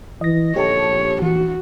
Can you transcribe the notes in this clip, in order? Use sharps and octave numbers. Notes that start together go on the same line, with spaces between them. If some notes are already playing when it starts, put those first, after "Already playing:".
E3 D#5 A#6
A#1 G4 A4 C#5 A5
E3 F#4